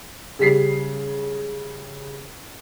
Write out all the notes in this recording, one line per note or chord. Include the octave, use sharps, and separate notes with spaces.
C#3 G3 B6 C7